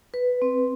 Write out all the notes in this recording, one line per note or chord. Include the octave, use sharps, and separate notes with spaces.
B4
C4